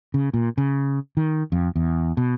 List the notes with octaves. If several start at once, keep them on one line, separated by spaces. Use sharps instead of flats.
C#3
A#2
C#3
D#3
F2
E2
B2